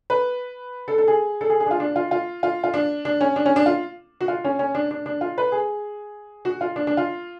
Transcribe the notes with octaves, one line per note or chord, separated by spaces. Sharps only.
B4
A4
A4
G#4
A4
G#4
G#4
D4
F4
D4
F4
F4
F4
F4
D4
D4
C#4
D4
C#4
D4
F4
F#4
F4
C#4
C#4
D4
D4
D4
F4
B4
G#4
F#4
F4
D4
D4
F4